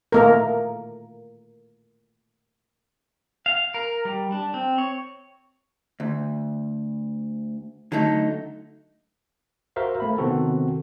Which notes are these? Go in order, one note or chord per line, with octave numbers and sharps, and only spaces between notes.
A3 A#3 A#4
F5
A#4
G3
D4
C4
C#5
D2
D3 F#3 A3 D#4
F#4 A#4 C5 E5 F5
A3 A#3 B5
C3 D#3 B3 C4 F#4 A4